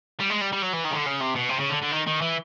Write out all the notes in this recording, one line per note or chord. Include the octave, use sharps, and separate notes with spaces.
G3
G#3
G3
G3
F#3
E3
D#3
C#3
D3
C#3
C3
B2
C3
C#3
D3
D3
D#3
D#3
E3